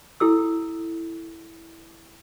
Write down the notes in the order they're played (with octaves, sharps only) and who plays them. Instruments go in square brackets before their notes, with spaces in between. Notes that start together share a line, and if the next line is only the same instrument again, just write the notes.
[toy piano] E4 A4 E6